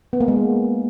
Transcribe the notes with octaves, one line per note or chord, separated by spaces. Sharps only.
B3
A#3
G#3